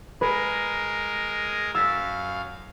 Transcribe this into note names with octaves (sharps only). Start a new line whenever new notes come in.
G#3 G#4 A#4 B4
F#2 F5 E6 A6 B6